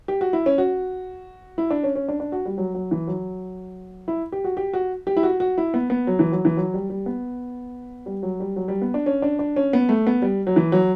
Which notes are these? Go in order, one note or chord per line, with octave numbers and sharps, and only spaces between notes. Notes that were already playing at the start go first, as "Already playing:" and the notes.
G4
F#4
E4
C#4
F#4
E4
D4
C#4
C#4
D4
D4
F#4
G3
F#3
F#3
E3
F#3
E4
G4
F#4
G4
F#4
G4
E4
F#4
F#4
E4
B3
B3
F#3
E3
F#3
E3
F#3
G3
G3
B3
G3
F#3
G3
F#3
G3
B3
D4
C#4
D4
D4
C#4
B3
A3
B3
G3
F#3
E3
F#3